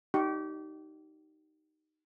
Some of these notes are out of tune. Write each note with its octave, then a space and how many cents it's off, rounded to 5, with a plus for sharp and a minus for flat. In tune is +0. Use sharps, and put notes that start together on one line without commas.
D#4 +0 G4 -30 C#6 +0